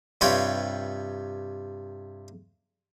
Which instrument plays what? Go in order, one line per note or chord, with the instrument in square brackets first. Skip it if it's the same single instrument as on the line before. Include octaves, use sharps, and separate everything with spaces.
[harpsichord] G2 C3 F4 B4 C#5 G5